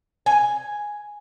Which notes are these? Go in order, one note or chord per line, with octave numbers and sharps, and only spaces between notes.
G#5